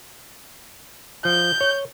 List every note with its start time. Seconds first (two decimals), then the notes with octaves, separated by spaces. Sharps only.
1.25 F3 G6
1.61 C#5